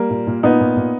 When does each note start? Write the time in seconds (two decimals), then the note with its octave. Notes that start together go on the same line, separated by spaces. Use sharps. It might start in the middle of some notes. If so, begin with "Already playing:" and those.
Already playing: G3 A#3
0.10 A#2
0.27 A#2
0.43 A#2 B3 D#4
0.60 A#2
0.76 A#2